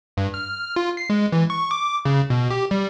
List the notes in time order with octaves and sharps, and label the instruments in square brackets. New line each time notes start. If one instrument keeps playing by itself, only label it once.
[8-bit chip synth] G2
F6
F4
C7
G#3
E3
C#6
D6
C#3
B2
G4
G3